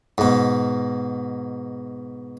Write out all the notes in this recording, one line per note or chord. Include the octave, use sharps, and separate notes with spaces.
G#2 B2